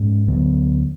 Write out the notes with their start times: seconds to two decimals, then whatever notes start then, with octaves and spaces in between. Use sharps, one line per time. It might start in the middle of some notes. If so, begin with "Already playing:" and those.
Already playing: G#2 G#3 C#4
0.28 D2 D3 F#3 B3